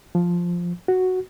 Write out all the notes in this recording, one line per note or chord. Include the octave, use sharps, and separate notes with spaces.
F3
F#4